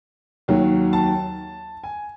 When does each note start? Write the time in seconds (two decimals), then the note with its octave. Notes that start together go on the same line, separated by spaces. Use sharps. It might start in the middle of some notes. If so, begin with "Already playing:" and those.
0.48 D#2 D#3 F#3
0.93 A5
1.84 G#5